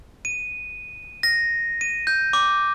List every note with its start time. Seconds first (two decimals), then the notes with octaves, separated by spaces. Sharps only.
0.25 D#7
1.23 A#6
1.81 D#7
2.07 G6
2.33 D6